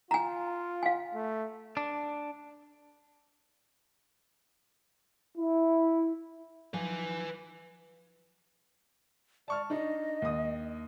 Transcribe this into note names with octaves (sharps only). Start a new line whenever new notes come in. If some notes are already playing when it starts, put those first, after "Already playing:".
F4 G#5 A#5
F5 G#5
A3
D4
E4
F3 F#3 D#4 B4 G#5
D5 A5 C#6 F6
D4 D#4 D#5
D#2 D#6